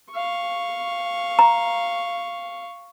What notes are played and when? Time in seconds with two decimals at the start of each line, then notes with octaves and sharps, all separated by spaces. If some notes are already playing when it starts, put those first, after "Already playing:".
0.11 F5 C#6
1.39 A#5